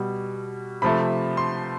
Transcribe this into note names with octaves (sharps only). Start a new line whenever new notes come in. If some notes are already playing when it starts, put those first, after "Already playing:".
Already playing: B2 G3
C3 F3 A3 B5
C6